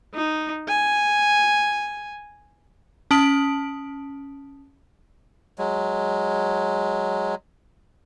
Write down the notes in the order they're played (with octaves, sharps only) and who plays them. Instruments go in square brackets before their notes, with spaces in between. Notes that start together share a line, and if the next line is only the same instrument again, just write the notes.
[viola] D#4
G#5
[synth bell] C#4 A5 D#6 D7 F#7
[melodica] F#3 G#3